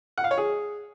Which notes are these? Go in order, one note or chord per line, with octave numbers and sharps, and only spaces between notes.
F#5
F5
C#5
G#4